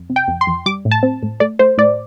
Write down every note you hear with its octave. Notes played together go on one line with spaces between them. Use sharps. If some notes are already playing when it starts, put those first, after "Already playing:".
Already playing: F2
C3
G5
F2
C6
F2
G3 D6
A2
A5
C4
A2
A3 D5
A3 C5
A2 D5